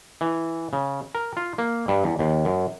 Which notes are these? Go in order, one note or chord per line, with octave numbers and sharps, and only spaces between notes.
E3
C#3
A#4
F4
A#3
G2
E2
D#2
F#2